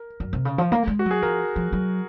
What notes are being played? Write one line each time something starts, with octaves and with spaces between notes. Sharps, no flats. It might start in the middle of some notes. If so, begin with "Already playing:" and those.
Already playing: A#4
F#2
C3
C#3
F3
A#3
G#3
F#4
F#3
G#4
F3 A#4
F3
F#3